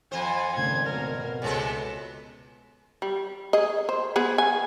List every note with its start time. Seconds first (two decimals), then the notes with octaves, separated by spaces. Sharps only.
0.12 F2 C5 G#5
0.56 G#1 C#3 A3 G#6
0.86 B2 A#4
1.42 C#2 C3 G#3 A4 B4 C#5
3.02 G3
3.53 G#4 D#5
3.89 C5
4.16 B3 G#4 B4
4.38 G#5